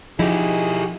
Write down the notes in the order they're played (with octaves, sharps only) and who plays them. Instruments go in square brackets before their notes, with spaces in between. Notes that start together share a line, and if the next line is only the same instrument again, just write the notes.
[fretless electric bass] F3 [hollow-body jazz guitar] D#4 [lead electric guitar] E4 G4 [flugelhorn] G#4